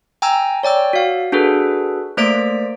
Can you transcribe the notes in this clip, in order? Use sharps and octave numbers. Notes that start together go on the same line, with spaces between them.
G5 G#5 A#5 E6
C#5 D5 G5 E6
F#4 F5
D4 F#4 G#4 A4 B4
A3 A#3 C5 D5 B6 D7